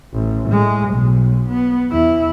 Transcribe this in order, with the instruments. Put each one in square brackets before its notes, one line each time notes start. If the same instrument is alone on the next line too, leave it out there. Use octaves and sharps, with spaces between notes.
[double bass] A1
A2 G#3
B1 B2
B3
E2 E4